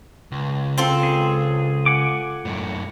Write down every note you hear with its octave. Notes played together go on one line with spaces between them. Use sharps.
C#2
C4 F4 A4
G#4
F#5 G#5 D6
F#2 A2